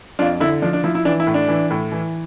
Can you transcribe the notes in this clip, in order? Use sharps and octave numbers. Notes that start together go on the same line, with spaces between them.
F2 D4 F4
D3 E4
F3 D4
D4
F3 E4
E4
E3 D4
E4
A2
D4
E3
A2
E3